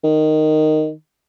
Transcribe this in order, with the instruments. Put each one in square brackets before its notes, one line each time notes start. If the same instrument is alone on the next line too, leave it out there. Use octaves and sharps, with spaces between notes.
[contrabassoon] D#3